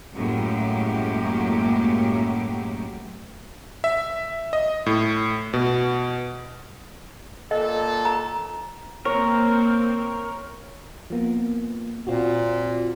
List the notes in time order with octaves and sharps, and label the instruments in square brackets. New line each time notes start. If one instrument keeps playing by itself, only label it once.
[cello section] F#2 A2 F#3 G#3 A#3 G4
[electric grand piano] E5
D#5
A2
B2
[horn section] A#2 A4 [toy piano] D#5
[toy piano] A#5
[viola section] A#3 C4 [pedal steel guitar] A#4 [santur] C#5
[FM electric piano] F3 A#3 B3
[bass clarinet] A#2 [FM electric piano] C4 F4 F#4